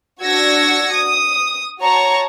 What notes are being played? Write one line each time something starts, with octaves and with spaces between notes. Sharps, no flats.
D4 F#4 E6 G#6 A#6 C#7
D#6
F#4 C#5 A5 A#5 C#6